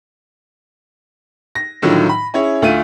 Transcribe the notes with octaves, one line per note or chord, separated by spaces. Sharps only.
A#6
A2 D3 D#3 F3 F#3
B5
C#4 E4 G#4 C#5
D2 A3 F4 D#7